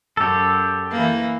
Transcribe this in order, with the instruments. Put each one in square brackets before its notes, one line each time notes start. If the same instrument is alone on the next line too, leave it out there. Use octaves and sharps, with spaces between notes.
[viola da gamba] F#2 [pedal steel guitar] G4 A4
[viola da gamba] E3 A#3